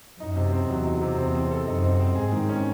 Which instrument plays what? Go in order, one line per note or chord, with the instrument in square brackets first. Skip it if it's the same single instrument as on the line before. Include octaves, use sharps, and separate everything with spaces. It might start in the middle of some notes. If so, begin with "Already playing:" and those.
[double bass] F#2 [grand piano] D#4
[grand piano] C3
C4
[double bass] E2 [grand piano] F#3
[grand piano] D#4
C3
[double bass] E2 [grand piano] C4
[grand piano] C4
A4
[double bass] F#2 [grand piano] D#4
[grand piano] C4
C4
[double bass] G#2 [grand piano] G#4
[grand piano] D#3
C#4